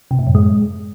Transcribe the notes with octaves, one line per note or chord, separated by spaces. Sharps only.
C3
A2
F#2
G#3